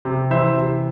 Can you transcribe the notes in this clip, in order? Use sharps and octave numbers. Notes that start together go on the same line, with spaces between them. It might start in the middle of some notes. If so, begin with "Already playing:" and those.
C3
E3 C5 E5
C3